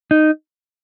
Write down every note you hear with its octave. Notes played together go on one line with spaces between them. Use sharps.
D#4